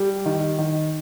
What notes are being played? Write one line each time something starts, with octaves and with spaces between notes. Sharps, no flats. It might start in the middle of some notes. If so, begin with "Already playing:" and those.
Already playing: G3
D#3
D#3